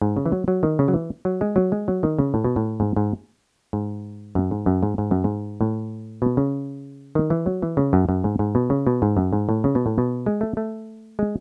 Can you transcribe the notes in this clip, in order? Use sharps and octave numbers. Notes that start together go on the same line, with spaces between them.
G#2
C#3
E3
F#3
F#3
D#3
C#3
F#3
E3
F#3
G#3
F#3
G#3
F#3
D#3
C#3
A2
B2
A2
G#2
G#2
G#2
F#2
G#2
F#2
G#2
G#2
F#2
G#2
A2
B2
C#3
D#3
E3
F#3
E3
C#3
F#2
F#2
G#2
G#2
B2
C#3
B2
G#2
F#2
G#2
A2
C#3
B2
A2
B2
G#3
A3
A3
G#3